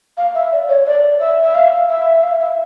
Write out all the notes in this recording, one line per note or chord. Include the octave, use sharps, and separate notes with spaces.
F5
E5
D5
C#5
D5
E5
E5
F5
E5
E5
F5
E5